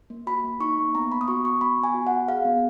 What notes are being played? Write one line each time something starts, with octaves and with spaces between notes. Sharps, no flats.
A#3
F#4 B5
A#3
D#4 C#6
A#3
B3 A#5
B3 B5
D#6
F#4 C#6
F#4 C#6
B3 B5
B3
G#5
F#4
F#4 F#5
G#4 F5
B3